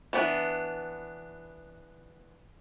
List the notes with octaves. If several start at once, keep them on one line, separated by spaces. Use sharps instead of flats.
E3 B3 D4